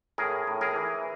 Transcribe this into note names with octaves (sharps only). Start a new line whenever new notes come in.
A2 G#4 A#4
A2
G#4 A#4
E3